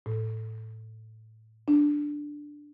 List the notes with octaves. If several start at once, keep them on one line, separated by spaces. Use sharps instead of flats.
A2
D4